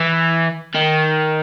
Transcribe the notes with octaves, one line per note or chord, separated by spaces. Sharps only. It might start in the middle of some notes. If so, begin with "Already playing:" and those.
Already playing: E3
D#3